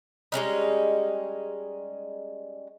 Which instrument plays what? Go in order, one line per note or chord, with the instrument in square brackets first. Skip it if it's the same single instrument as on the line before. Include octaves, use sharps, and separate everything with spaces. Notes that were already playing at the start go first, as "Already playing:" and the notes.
[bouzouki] G3 G#3 C#4 D#4